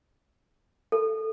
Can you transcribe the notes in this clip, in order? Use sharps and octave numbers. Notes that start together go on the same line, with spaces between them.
A4